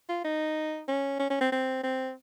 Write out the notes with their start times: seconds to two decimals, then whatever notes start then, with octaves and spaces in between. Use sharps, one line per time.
0.09 F4
0.24 D#4
0.88 C#4
1.19 C#4
1.30 C#4
1.41 C4
1.52 C4
1.83 C4